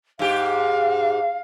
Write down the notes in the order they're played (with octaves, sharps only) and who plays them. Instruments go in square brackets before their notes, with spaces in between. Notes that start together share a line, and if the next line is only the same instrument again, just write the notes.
[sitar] G#2 G4 [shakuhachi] F5